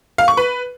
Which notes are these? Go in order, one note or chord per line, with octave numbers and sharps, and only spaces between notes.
F5
C#6
B4